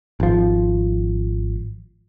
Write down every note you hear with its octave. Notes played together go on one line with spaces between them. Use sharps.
G#1 F3